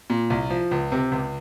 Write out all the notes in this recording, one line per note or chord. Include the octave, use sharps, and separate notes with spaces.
A#2
C2
F3
C#2
C3
C#2